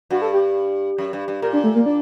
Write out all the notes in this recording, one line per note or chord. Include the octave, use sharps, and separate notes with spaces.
G2 F#4
A4
G4
F#2
G2
G2
A#2 A#4
D4
A3
A#3
D4